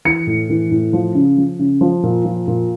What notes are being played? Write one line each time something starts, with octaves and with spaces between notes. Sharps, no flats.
E3 C#7
A2
E3
A2
F3
C#3
F3
C#3
F3
A#2
F3
A#2